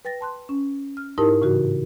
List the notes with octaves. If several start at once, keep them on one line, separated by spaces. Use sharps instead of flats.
B4 G5 A6 A#6
A5 C6 F#6
C#4
F6
G#2 D#4 E4 G4 A#4 A5
A2 C#3 E3 F#4